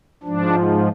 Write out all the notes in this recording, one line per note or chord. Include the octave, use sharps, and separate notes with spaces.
G#2 F3 D4